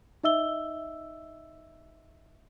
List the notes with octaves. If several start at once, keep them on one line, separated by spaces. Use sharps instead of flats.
D#4 D#5 E5 E6 G7